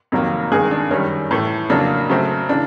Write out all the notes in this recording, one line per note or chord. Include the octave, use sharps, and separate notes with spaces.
F2 C3 D#3 F#3 A#3
G2 D#3 G#3 G#4
D4
F#2 D#3 G3 C#4
A2 E3 A3
F2 C#3 F#3 A#3 D4
C#3 F#3 A3 C4
C#3 E3 D4